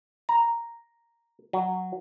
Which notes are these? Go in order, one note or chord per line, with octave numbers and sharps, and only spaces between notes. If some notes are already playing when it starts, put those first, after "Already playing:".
A#5
F#3